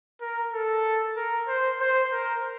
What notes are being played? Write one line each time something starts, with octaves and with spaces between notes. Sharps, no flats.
A#4
A4
A#4
C5
C5
A#4